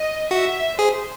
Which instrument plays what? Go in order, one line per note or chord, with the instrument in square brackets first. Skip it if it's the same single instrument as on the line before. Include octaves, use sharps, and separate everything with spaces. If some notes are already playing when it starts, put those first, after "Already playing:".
Already playing: [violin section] D#5
[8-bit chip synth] F#4 [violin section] E5
[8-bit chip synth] G#4 [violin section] C5